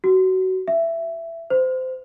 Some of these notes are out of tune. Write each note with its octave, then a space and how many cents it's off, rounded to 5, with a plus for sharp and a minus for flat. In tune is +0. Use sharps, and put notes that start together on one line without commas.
F#4 +20
E5 +15
C5 -25